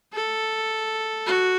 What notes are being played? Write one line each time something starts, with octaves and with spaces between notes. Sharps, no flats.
A4
F#4